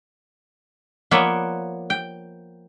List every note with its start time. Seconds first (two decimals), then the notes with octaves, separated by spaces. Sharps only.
1.11 F3 A#3 B3 C#5 D5 E5
1.90 G5